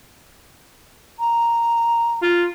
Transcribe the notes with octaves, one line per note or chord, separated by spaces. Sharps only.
A#5
F4